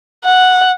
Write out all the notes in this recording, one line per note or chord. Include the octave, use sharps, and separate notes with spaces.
F#5